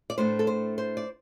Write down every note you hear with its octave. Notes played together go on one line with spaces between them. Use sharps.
D5
A2 A3 D4 C5
A4
C5
C5
D5